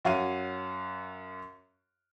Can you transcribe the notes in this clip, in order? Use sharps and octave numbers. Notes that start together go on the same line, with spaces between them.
F#2 F#4 C#5 F5 F6 D#7